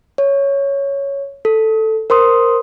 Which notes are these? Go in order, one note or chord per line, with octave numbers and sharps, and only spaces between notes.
C#5
A4
A#4 C5 C6 D#6